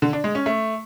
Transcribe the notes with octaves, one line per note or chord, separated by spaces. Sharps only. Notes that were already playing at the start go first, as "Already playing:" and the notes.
D3
D4
G#3
C#4
A3